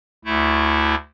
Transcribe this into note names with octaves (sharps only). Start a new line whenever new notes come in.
D2 A3 E4